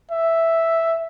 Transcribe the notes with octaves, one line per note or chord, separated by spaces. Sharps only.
E5